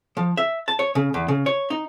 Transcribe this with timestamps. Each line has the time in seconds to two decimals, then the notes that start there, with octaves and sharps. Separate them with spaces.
0.17 F3
0.37 E5
0.68 A5
0.79 C#5
0.95 C#3
1.14 E2
1.28 C#3
1.46 C#5
1.70 D#4